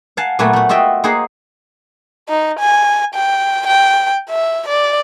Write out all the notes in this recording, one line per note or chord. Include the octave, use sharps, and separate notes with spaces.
F5 F#5 G#5 A5
A#2 F#3 A3 B3 F#4 G#5
A3 F#4
F4 F#4 D#5 E5 G5
A#3 G#4 C5 D#5 F#5 G#5
D#4
G#5
G5
G5
E5
D5